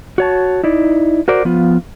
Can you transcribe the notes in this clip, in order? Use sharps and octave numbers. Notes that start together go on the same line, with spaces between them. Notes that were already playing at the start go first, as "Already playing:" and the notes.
F#4 C#5 A5
D#4 E4 D5
F#4 A#4 C5 D5
F3 B3 F4